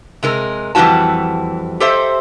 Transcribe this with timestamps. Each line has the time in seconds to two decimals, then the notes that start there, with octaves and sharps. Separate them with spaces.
0.23 C3 G#3 A#4
0.75 F2 E3 G3 C#4 F#4 A5
1.80 G4 A4 C5 D#5 E5